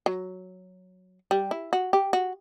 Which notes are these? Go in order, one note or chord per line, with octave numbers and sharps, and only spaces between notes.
F#3
G3
E4
F#4
G4
F#4